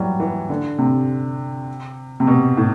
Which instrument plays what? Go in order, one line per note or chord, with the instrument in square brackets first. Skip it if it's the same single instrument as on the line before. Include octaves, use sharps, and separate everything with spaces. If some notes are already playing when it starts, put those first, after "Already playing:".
Already playing: [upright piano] E3 F#3 G3
E3
D3
C3
C3
B2
A2